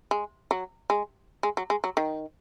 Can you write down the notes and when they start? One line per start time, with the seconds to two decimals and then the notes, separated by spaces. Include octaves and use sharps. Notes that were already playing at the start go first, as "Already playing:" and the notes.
0.11 G#3
0.51 F#3
0.90 G#3
1.43 G#3
1.57 F#3
1.70 G#3
1.84 F#3
1.97 D#3